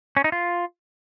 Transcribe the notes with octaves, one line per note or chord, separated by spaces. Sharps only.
C#4
D#4
F4